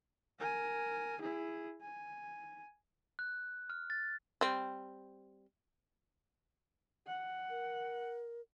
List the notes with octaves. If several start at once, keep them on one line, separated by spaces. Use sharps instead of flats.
A#4 G#5
E4 G#4
G#5
F#6
F6
A6
G3 C4
F#5
A#4